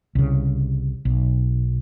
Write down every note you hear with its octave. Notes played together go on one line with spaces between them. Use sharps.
C2 C#3
B1